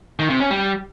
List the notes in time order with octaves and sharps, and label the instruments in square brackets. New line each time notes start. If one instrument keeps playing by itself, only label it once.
[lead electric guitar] D#3
C3
C#4
G3